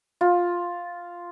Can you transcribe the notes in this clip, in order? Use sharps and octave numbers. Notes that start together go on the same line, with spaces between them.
F4